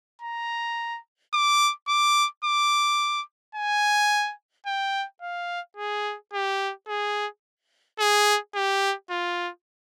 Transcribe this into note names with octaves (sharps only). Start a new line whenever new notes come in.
A#5
D6
D6
D6
G#5
G5
F5
G#4
G4
G#4
G#4
G4
F4